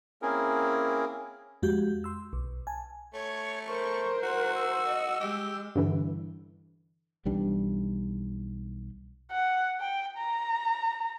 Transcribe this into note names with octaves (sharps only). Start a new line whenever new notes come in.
A#3 C4 C#4 E4 G#4 A#4
F2 G#3 F#4 G4 G6
C6 E6
B1
G#5 A5
A3 C#5
A#4 C5 C#6
F#4 F#6
E6
D#5
G#3 G4
G2 D3 E3
B1 E3 G3 D4
F#5
G5
A#5